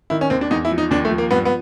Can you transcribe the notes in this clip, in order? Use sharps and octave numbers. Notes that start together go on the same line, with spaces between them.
D#3 E4
C#4
D#2 C4
D4
E2 D#4
E4
F3
D#4
D#2 D4
A3
F3
A#3
G2 B3
B3